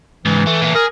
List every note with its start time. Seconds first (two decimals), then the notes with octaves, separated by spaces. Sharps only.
0.26 C#2 G#2 E3
0.47 A3
0.62 A#2 A3
0.75 G#4 A#4